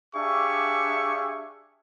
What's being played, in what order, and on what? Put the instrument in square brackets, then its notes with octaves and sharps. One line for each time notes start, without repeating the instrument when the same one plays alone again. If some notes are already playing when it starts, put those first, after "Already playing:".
[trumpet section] D4 G4 G#4 E5 F5 C#6